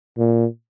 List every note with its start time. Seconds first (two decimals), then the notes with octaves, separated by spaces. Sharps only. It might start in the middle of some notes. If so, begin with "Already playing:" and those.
0.18 A#2